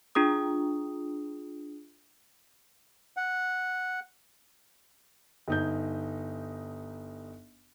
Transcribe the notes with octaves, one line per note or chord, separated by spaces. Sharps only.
D4 F4 G#4 D#6
F#5
G1 D#4 G6